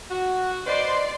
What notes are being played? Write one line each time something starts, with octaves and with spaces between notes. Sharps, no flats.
F#4 F#5
B4 C5 D5 D#5 C6